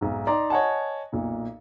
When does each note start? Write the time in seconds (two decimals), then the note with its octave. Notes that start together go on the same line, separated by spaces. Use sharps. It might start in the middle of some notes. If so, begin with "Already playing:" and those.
0.01 B1 G#2
0.27 D#4 D5 A#5 C6
0.50 C#5 D#5 F#5 G#5 A5
1.12 B1 A#2